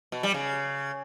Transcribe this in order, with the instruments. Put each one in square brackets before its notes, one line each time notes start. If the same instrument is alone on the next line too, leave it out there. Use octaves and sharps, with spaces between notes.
[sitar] B2
G3
C#3